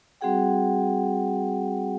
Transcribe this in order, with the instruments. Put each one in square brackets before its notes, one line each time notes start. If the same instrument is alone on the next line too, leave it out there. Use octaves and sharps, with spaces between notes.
[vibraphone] G3 C4 F#4 G#4 F#5 G5